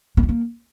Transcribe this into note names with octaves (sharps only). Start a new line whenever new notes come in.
A#3
A3
A#3